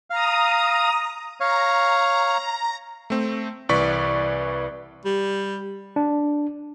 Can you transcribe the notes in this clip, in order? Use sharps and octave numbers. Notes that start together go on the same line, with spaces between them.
F5 A#5 D#6
C#5 F5 A#5
A3 C4
C2 E3 B4 D5 C#6 B6
G3
D4